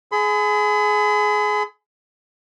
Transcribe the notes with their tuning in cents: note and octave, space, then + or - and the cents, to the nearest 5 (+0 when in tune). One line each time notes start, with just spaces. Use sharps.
G#4 +20 B5 +45